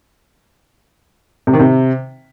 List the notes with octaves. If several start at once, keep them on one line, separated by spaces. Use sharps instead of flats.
C3
D#3
C3